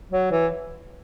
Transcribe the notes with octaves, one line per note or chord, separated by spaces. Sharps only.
F#3
E3